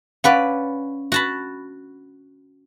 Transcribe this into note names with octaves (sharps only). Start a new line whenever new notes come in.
C#4 B4 D5 F5 F#5
F#4 A5 B5